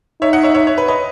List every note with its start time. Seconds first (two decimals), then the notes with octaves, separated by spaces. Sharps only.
0.21 D#4 C#5 E5
0.33 D#5 F#5
0.43 C#5 E5
0.55 C#5 E5
0.67 C#5
0.78 B4
0.88 B4 D#5